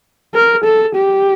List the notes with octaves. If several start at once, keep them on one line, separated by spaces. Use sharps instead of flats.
A#4
A4
G4